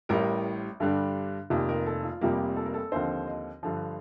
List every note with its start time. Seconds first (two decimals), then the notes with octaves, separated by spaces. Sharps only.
0.09 A1 A2 G3 A#4
0.80 G2 D3 G3 D4
1.50 F1 F2 D#3 A#3 G4
1.69 A#4
1.86 A4
2.04 F4
2.21 F1 F2 C3 G3 A#3 G4
2.56 A4
2.65 A#4
2.74 A4
2.92 D#2 D3 F3 C4 D#4 C5
3.27 D#5
3.63 G2 D3 F3